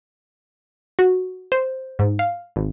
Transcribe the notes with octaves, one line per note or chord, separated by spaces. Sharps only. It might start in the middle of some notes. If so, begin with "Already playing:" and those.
F#4
C5
G#2
F5
G#1